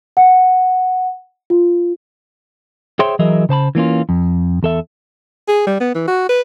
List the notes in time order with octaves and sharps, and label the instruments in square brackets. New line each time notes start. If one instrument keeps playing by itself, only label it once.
[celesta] F#5
F4
[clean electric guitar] G#4 C5 C#5 E5 G5 C6
E3 F#3 G#4 A#4 D#5 E5
C#3 C5 A5 B5
E3 A#3 C#4 F4
F2
E2 A4 E5
[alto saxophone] G#4
G3
B3
E3
F#4
B4